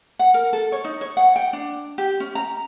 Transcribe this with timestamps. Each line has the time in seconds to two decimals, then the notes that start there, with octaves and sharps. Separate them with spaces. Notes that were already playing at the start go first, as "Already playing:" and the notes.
0.19 F#5
0.34 A#4
0.53 A4
0.72 C#5
0.85 D#4
1.01 C#5
1.17 F#5
1.36 G5
1.53 D4
1.98 G4
2.20 C#4
2.35 A#5